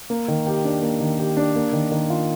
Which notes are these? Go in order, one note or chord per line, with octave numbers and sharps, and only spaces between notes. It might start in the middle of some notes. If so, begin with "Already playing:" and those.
A#3
D#3
G4
D4
A#3
D#3
G4
D4
A#3
D#3
D#3
F4